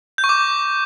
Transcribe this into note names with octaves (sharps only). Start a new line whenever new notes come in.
G6
C#6
D6